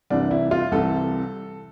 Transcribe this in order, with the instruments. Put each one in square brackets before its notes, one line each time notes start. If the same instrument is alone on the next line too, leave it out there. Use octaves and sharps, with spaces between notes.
[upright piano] C2 C3 E3 D4
E4
F4
C2 C3 E3 A4